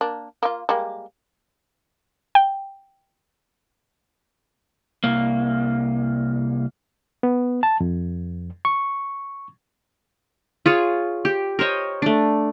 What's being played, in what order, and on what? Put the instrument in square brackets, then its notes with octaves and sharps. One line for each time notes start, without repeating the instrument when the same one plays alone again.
[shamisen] A#3 D4
A#3 F4
G3 G#3 A#3
[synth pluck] G5
[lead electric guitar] C2 A#3
[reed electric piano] B3
A5
F2
C#6
[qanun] F4 G#4 C#5
G4
A#4 C5 C#5 D#5
A3 D4